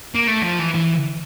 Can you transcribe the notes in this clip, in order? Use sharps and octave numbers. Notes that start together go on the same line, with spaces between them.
A#3
A3
F3
E3
E3